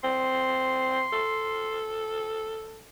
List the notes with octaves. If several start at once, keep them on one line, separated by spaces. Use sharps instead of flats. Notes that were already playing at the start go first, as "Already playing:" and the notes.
C4 C6
A4